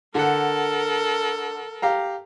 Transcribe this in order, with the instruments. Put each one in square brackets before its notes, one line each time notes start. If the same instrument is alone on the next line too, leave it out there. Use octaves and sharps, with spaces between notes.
[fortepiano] D3 F#5 [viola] A4 A#4
[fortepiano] G4 F5 A#5